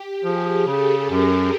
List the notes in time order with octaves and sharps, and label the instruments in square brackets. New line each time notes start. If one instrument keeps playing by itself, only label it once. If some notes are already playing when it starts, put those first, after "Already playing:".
Already playing: [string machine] G4
[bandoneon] F3 [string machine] G#4
[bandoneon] C#3 [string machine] A4
[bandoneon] F#2 [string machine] A#4